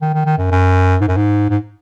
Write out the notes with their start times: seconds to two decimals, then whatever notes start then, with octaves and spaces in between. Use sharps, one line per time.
0.02 D#3
0.14 D#3
0.26 D#3
0.38 F#2
0.51 F#2
1.01 G#2
1.08 F#2
1.17 G#2
1.50 G#2